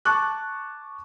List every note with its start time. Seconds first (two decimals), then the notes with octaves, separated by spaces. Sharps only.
0.05 A5 C#6 D6 F#6